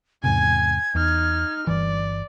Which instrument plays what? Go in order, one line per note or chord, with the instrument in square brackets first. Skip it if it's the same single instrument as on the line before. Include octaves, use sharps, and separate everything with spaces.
[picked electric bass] E2 G#2 C3 [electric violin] G#5 [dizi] G#6
[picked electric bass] E2 [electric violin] D#4 F6
[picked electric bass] G1 E3 [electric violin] D5